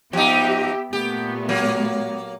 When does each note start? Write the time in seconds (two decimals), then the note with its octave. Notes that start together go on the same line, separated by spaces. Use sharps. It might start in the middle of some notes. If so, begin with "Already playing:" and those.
0.13 F3 B3 D#4 G4 E5
0.93 A#2 A3 B3 G4
1.49 F#3 A#3